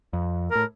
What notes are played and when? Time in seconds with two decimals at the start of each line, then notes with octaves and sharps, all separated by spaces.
0.13 F2
0.51 A2 A#4